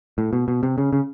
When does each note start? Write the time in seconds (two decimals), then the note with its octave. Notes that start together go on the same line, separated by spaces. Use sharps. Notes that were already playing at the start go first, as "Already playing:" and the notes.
0.18 A2
0.33 B2
0.48 B2
0.63 C3
0.78 C#3
0.93 C#3